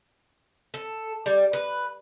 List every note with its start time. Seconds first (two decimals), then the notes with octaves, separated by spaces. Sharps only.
0.74 A4
1.26 G3
1.53 B4